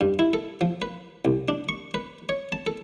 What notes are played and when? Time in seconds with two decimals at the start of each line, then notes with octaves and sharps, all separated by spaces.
0.01 G2
0.19 E4
0.33 A4
0.61 F3
0.82 B4
1.25 C2
1.48 D4
1.69 C#6
1.94 B4
2.29 C#5
2.52 A5
2.67 A4